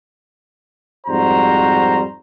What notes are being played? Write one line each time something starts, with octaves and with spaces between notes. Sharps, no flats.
F2 G#2 G3 F#4 C5 A#5